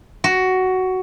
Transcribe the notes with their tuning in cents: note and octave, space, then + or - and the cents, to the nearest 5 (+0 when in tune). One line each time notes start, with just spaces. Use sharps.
F#4 +10